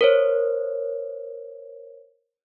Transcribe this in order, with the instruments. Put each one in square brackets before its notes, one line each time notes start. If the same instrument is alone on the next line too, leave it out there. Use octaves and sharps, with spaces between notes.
[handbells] A#4 C5 C#5